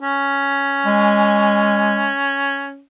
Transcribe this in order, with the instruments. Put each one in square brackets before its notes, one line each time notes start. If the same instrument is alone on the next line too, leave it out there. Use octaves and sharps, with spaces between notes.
[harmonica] C#4
[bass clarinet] G#3